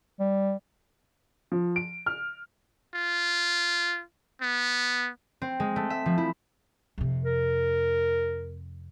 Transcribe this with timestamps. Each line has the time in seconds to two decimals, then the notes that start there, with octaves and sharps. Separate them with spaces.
0.20 G3
1.52 F3
1.76 D7
2.06 F6
2.94 F4
4.42 B3
5.42 C4
5.60 G#3
5.76 A3
5.90 E5
6.06 F3
6.18 E4
6.98 F2 C3
7.24 A#4